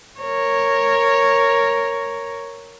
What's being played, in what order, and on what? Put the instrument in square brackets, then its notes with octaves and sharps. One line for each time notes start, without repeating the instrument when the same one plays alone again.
[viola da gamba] A#4 C#5